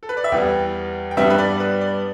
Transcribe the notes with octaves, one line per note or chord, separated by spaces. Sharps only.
A4
B4
D5
E5
E2 E3 G3 B3 G5
G5
G2 G3 B3 E5
B4
D5
B4
D5